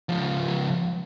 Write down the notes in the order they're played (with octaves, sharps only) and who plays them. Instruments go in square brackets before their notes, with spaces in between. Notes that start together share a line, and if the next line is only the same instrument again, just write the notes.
[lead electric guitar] C#2 F3